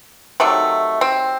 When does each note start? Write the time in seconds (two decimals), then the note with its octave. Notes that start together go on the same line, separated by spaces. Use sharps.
0.40 C3 D#3 F#3 A3
1.01 C4